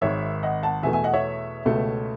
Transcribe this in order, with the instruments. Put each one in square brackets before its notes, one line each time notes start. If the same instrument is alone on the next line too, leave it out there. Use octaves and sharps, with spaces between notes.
[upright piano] G#1 G#2 D#3 C#5 E5
D#5 F#5
F#5 A5
E2 B2 A3 E5 G#5
E5 G#5
D#5 F#5
C#5 E5
C#2 B2 A3